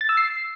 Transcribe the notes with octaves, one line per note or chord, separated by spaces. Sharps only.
A6
E6
C7